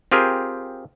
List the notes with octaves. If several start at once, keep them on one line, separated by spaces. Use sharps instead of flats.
C4 F4 G4 G#4 A#4